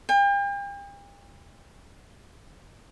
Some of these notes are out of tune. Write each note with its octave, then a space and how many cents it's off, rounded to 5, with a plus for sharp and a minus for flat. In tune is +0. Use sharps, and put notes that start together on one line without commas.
G5 +40